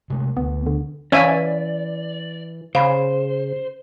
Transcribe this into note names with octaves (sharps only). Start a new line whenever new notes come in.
C3 G#3 A3
D2 B3
D3
E3 C#4 C5 D5 E5 F5 G#5
C#3 C5 F5 B5